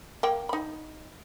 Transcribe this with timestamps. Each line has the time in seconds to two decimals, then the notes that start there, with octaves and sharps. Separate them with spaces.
0.23 A#3 G5
0.49 D#4 B5